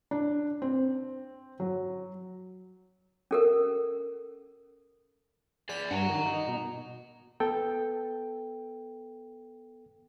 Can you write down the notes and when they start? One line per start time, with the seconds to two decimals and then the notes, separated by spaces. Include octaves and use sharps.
0.11 D4
0.62 C4
1.60 F#3
3.31 C#4 A4 A#4
5.69 G#4 D5 B6
5.91 G2 F#5 A5 A#5
6.09 D#3
6.25 D#4
6.48 B2
7.40 B3 A4 G5